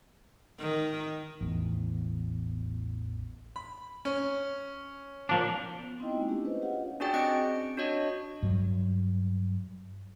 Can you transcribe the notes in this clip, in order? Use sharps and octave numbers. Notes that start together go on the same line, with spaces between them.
D#3
A1 E2
B5
C#4
A#2 F3 D4
B3
B3 C4 D#4 E4 D#5 G5
G#3 A#3 D#4 F4
A3 C#4 D4 E4 G4
C#4 G#4 B4 C5 D#5
F4 G4 C#5 D#5 F5 F#5
C#4 D4 F#4 G#4 D5 G5
C4 D#5 C#7 D7
D4 F#4 C#5 D#5
G2 F#3